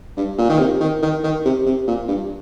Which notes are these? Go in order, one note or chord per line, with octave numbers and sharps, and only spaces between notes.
G2
A#2
D#3
C3
D#3
D#3
D#3
C3
C3
A#2
G2